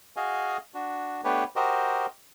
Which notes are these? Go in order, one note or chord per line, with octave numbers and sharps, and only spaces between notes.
F#4 G#4 D#5 F5 G#5
D4 F#4
A3 B3 D4 G4 B4 C#5
F#4 G4 A#4 C5 D#5